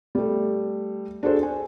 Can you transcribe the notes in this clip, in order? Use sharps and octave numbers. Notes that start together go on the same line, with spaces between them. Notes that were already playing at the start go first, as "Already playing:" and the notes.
G3 A3
D4 F#4 G#4 A4 C5
G#5